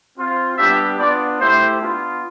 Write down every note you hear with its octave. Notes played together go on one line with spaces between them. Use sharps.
C4 F4
G3 B3 D4 G4 E5
B3 D4 F4 D5
A3 E4 G4 C5
B3 D4 F4